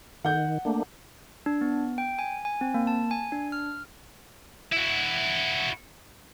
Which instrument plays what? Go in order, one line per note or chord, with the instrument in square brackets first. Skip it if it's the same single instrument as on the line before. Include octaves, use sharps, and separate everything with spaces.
[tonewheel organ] D#3 [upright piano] F#5 G6
[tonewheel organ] A3 A#3 D4
[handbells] D4
B3
G5
G#5
G#5
C4
A#3
A5
G#5
D4
F6
[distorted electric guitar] E4 F#4